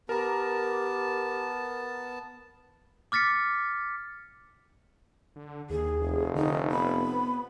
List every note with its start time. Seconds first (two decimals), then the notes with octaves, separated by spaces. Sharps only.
0.09 B3 G4 A#4 A5 A#5
3.12 D6 F6 A6 B6 C#7
5.36 D3
5.70 D#2 G#4
6.00 F1
6.35 D3 D#4
6.71 B3 B5